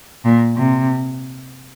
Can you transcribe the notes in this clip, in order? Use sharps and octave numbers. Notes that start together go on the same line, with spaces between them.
A#2
C3